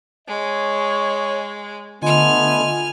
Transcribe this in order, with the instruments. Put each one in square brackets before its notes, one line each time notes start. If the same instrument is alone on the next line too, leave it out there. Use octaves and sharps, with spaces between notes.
[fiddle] G#3 [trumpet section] C#5 D#5
[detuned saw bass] D3 [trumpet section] A3 B3 [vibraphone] F4 D#5 C6 [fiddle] G#5 F6